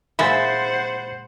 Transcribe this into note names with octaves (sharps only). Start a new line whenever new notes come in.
A#2 G#3 C5 E5 F#5 B5 A6